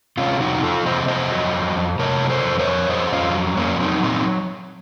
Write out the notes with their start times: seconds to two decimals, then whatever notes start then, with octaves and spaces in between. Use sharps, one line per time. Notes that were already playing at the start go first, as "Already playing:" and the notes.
0.18 C3 C#4 F4
0.40 F2 D#4 F#4
0.63 F2 F4 A4
0.86 C3 C5 D#5
1.08 F2 C5 D#5
1.32 F#3
1.54 F2
1.76 F2
1.99 C3 A#4 C#5
2.22 F#3
2.29 A4 C5
2.44 F2
2.59 A#4 C#5
2.67 F2
2.90 F2 C5 D#5
3.12 F2 C#4 F4
3.34 F#3
3.57 F2 A#3 C#4
3.80 F#3 C4 D#4
4.03 A#2 C4 D#4